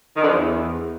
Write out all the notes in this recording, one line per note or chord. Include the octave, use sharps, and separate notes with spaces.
D#3
D3
F3
E2